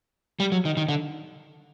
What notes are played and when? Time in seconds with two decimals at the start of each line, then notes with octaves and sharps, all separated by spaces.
0.40 G3
0.52 F#3
0.65 D#3
0.77 D#3
0.89 D3